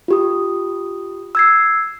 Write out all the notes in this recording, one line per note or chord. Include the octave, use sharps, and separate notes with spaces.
F4 G4 D#6
E6 G#6 C7